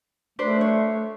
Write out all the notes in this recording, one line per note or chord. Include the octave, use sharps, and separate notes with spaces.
A3 D4 B4 C5
C#5